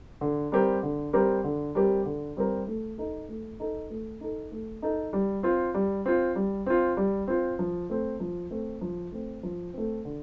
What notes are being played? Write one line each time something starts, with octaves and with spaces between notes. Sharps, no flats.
D3
G3 C4 G4 A#4
D3
G3 C4 G4 A#4
D3
G3 C4 G4 A#4
D3
G3 C4 G4 A#4
A3
D#4 A4
A3
D#4 A4
A3
D#4 A4
A3
D#4 A4
G3
C4 F4
G3
C4 F4
G3
C4 F4
G3
C4 F4
F3
A3 C4
F3
A3 C4
F3
A3 C4
F3
A3 C4
D3